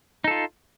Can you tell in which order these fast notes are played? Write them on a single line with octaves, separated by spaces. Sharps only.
D#4 A4 F4